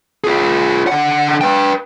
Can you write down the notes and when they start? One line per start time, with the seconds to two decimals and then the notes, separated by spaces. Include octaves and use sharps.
0.24 F4 G#4
0.87 D3 F#5
1.41 B4 G5